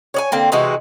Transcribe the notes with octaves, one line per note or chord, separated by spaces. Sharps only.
C#5 D5 G#5
D3 A#3 C4
C3 E3 G#3 F#4